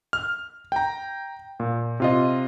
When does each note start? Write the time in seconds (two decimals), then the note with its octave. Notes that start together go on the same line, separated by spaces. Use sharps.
0.13 F6
0.72 G5 A#5
1.60 A#2
2.00 C3 F4 D#5